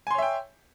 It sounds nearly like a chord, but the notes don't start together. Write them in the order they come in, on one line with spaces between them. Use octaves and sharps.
G#5 C6 C#5 E5 G5